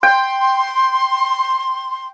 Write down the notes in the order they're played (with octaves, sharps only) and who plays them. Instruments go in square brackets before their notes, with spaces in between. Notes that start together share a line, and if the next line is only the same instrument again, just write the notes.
[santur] G5 [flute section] C6